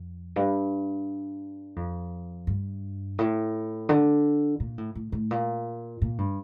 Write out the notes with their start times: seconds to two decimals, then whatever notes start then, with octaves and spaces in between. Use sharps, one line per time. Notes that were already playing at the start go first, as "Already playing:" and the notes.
Already playing: F2
0.36 G2
1.76 F2
2.47 G2
3.19 A2
3.89 D3
4.60 A#2
4.78 A2
4.95 A2
5.12 A2
5.31 A#2
6.02 A#2
6.18 G2